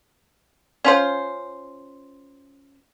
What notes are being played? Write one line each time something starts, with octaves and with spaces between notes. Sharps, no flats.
C#4 F4 C5